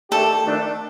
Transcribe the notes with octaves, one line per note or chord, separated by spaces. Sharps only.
D#3 A3 D4 G4 A4
F2 D#3 A3 D4